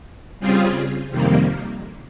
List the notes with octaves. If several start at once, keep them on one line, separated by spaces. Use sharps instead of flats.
C#3 G3 C4 F4 G#4
F2 C3 D#3 G3 A#3